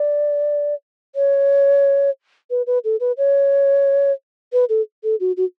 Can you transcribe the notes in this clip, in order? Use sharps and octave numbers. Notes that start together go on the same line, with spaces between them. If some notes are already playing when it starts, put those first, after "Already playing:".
Already playing: D5
C#5
B4
B4
A4
B4
C#5
B4
A4
A4
F#4
F#4